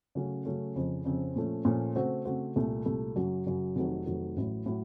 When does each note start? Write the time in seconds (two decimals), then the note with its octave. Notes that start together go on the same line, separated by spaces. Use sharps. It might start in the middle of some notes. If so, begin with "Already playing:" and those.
0.15 C#3 F#3 A3 C#4
0.45 C#3 F#3 A3 C#4
0.76 F2 C#3 F3 C4
1.05 F2 C#3 F3 C4
1.36 A#2 F3 A3 C#4
1.65 A#2 F3 A3 C#4
1.95 C#3 A3 C4 F#4 C5
2.25 C#3 A3 C4 F#4 C5
2.56 C2 A#2 A3
2.86 C2 A#2 A3
3.16 F#2 C#3 F#3
3.46 F#2 C#3 F#3
3.76 F1 F2 D#3 F#3 A3
4.06 F1 F2 D#3 F#3 A3
4.36 A1 A2 F#3
4.66 A2 F#3